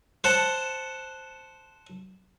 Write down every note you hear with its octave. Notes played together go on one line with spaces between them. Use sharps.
C5 F#5 A5